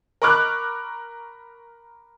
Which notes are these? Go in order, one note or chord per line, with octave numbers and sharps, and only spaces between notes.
A#4 B5 C#6 D6 F6 F#6